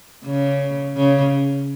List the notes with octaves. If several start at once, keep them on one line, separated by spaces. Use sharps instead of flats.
C#3
C#3